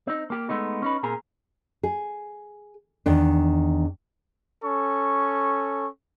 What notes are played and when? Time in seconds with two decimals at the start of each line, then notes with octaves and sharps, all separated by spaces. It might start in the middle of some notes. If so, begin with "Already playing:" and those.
0.07 C4 D#4
0.30 A#3 G4
0.49 G#3 A3 B3 D#4
0.82 C#4 D#4 B4
1.03 A#2 C4 G#4 A#4
1.83 G#4
3.06 E2 D#3 D4
4.63 C#4 A4 C#6